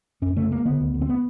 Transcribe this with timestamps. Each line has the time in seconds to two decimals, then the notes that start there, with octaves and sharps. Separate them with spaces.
0.22 F#2 C#4
0.37 C#3 A3
0.51 C#3 A#3
0.65 D3 B3
0.80 D2
0.94 D2
1.02 C4
1.09 B3